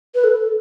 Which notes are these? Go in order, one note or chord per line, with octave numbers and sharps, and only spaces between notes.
B4
A4